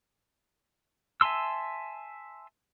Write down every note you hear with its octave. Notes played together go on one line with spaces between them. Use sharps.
E5 G#5 A5 C6 E6